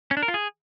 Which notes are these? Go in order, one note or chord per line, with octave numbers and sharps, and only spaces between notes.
C#4
D4
A#4
F4
G#4